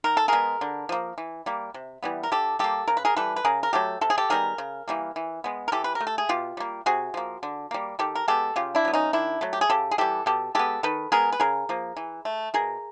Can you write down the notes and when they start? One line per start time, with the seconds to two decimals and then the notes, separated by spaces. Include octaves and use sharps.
0.04 D#3 A#4
0.17 A4
0.28 G#3 B3 G#4 A#4
0.61 D3
0.89 F3 A#3
1.18 E3
1.46 G3 A#3
1.74 C3
2.03 E3 G3 B3
2.23 A#4
2.32 D3 G4 A4
2.59 G3 A#3 G4 A4
2.88 C#3 A#4
2.97 B4
3.05 G#4 A#4
3.17 E3 G3 A4 B4
3.36 B4
3.45 C#3 G#4 A#4
3.63 A#4
3.73 F#3 A3 G4 A4
4.01 C3 A4
4.10 G#4
4.18 G4 A4
4.30 D#3 G3 B3 G#4 A#4
4.58 C#3
4.88 E3 G3 A#3
5.16 E3
5.44 G#3 B3
5.68 A#4
5.72 E3 G4 A4
5.84 B4
5.95 A#4
6.01 A3
6.07 A4
6.18 G#4
6.29 B2 F4 G4
6.57 G3 A#3
6.86 C3 F#4 G#4
7.14 F3 A#3
7.43 D3
7.71 G3 A#3
7.99 D#3 G4 A4
8.15 A#4
8.28 G#3 B3 G4 A4
8.56 C#3 F4 G4
8.75 D4 E4
8.85 F#3 B3
8.93 C#4 D#4
9.13 D#3 D4 E4
9.41 F#3 A3
9.53 G4
9.61 G#4
9.70 C#3 G4 A4
9.91 G#4
9.98 E3 G3 G4 A4
10.26 B2 G4 A4
10.55 G#3 B3 G4 A4
10.83 D#3 A4 B4
11.12 G#3 B3 G#4 A#4
11.32 B4
11.40 C#3 G#4 A#4
11.69 F3 A#3
11.97 E3
12.25 A3
12.54 B2 G#4 A#4